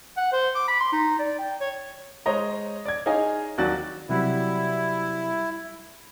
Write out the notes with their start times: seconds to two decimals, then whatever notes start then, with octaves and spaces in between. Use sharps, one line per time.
0.17 F#5
0.33 C5
0.55 D6
0.68 B5
0.80 C6
0.92 D#4
1.19 D5
1.39 G5
1.61 C#5
2.26 G#3 C5 C#5 D#5 A#5
2.85 D5 G#6
3.06 D#4 G#4 C#5 D#5 F5 G#5
3.58 D#2 F#3 F#4 D5 F#6 A6
4.09 C3 F#3 G3 E4